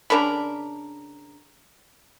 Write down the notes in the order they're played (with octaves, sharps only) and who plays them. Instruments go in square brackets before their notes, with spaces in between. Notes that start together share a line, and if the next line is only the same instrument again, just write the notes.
[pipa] C#3 D4 A#4 B5